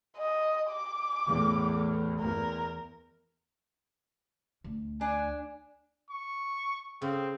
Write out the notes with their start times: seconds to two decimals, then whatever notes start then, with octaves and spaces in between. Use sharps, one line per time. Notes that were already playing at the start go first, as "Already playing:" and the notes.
0.17 D#5
0.71 D6
1.28 E2 A2
2.21 E2 A#4
4.64 D2
5.01 D4 G#5
6.10 C#6
7.02 C#3 C4